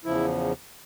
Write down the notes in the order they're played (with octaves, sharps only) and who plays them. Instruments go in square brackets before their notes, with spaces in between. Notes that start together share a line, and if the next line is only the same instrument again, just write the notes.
[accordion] E2 C#3 F3 E4